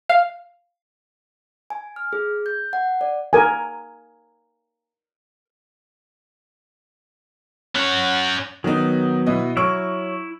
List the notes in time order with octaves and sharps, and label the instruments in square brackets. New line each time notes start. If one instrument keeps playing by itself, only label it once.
[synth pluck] F5
[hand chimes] G#5
F6
G#4
G6
F#5
D5
[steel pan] A#4 G#5
[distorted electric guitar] C#4 F#5
[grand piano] D#3 D#4 [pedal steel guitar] F#3 B3
[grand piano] B2 E4 D#5
[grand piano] F#3 C#6 D7 [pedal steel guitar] E4 E6 F6